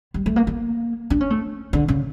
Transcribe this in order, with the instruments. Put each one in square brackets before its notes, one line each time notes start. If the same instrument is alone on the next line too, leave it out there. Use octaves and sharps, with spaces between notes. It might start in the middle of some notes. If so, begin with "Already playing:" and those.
[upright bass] G3
A3
A#3
A#3
D4
C#4
A3
D3
C#3